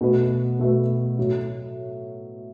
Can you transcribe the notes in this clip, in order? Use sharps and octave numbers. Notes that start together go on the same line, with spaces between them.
B2 A3 F#4 B4
B2 A3 F#4 B4
A2 F#3